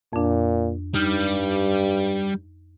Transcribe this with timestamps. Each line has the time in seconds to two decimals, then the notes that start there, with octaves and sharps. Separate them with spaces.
0.13 F2 A#2 D4
0.94 G2 G3 D#4 F6 G6